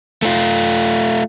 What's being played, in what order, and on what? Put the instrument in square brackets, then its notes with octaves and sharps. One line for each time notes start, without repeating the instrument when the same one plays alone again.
[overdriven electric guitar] A3 F4